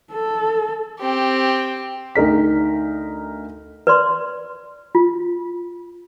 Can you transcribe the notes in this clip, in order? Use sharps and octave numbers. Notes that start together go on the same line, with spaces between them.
A4
C4 G4
D2 D#4 A#4 B6
B4 D5 C6
F4